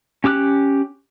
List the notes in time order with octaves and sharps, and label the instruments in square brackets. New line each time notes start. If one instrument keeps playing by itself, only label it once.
[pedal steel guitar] C#4 G4 D6 E6 F#6